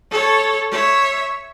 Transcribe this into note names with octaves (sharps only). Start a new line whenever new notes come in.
A4 C#5
C#5 E5